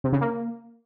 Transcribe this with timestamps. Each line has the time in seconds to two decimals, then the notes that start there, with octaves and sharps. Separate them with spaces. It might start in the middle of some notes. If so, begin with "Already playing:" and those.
0.04 C3
0.13 C#3
0.21 A#3